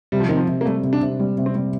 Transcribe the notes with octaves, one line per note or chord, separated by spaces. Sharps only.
C3 G3
F3
D#3 C4
F3
C3
A#3
G3 A3
C3
D4
C3
G3
C3
C4
G3